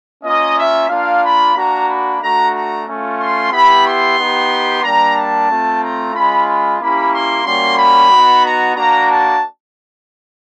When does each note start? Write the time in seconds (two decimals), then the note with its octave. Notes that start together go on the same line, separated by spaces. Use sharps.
0.23 A#3 C#4 F4 D#5
0.57 E5
0.89 A#3 D4 F4 F5
1.22 B5
1.55 A#3 D4 F#4 A#5
1.87 B5
2.21 A3 D4 F#4 A#5
2.53 A#5
2.86 A3 C#4 F4
3.19 C6
3.51 B3 E4 G4 B5
3.84 C6
4.17 B3 D#4 G4
4.83 G3 A#3 D4 A#5
5.16 A5
5.48 A3 C4 F4
5.80 A#5
6.14 G#3 C#4 F4 B5
6.47 B5
6.79 A#3 C#4 E4 G4 B5
7.11 C6
7.44 G3 A#3 C#4 F#4 C6
7.77 B5
8.10 B3 D#4 F#4
8.43 A#5
8.75 A#3 D4 F#4 A#5
9.09 A5